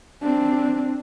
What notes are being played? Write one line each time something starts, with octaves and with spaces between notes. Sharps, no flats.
C4 D4